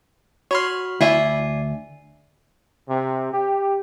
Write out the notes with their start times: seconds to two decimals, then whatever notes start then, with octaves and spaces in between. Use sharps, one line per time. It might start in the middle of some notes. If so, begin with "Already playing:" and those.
0.51 F#4 C#5 B5 C6 F6
1.01 D2 E4 D5 E5 G#5 C7
2.88 C3
3.32 G4